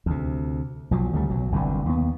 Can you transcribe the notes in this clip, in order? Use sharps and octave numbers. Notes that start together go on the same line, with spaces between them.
D2 C3
B1 F3 F#3
D2 C#3 G3 A3
B1 F#3
G1 C2 F#2 D3
D#2 B3